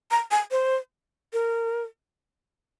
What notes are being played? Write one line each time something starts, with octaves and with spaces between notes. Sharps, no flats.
A#5
G#5
C5
A#4